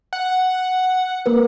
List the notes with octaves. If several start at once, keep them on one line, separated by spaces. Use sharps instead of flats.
F#5
A#3 A#4 B4